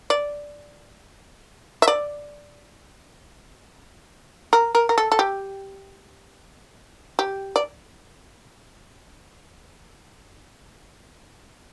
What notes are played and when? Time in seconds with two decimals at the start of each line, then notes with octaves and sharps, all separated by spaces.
0.10 D5
1.82 E5
1.88 D5
4.53 A#4
4.75 A#4
4.89 A#4
4.98 A4
5.12 A4
5.19 G4
7.19 G4
7.56 D5